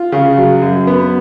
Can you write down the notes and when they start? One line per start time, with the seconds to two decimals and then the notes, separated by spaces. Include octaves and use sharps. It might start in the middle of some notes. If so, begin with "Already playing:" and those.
Already playing: F4
0.12 C#3
0.37 F#3
0.62 F#2
0.87 B3